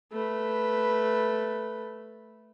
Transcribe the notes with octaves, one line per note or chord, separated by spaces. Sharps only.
A3 B4